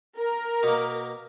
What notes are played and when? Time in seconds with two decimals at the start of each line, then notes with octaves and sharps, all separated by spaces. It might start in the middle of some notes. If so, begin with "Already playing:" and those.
0.17 A#4
0.63 B2 A#3